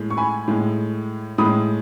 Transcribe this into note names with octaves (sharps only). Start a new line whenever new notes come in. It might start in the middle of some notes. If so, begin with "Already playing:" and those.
Already playing: A2 G#3
C#6
G#5 B5
A2 G#3
A2 G#3 B5 D#6